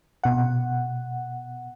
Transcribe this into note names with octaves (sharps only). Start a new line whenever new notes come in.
B2 F#5